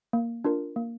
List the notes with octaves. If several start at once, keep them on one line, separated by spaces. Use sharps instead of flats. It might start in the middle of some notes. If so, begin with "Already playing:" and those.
A#3
D4 F4 A#4
A#3